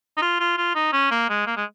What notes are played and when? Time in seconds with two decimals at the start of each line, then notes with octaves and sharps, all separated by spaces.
0.17 D#4
0.22 F4
0.40 F4
0.57 F4
0.75 D#4
0.93 C#4
1.11 A#3
1.29 G#3
1.47 A#3
1.57 G#3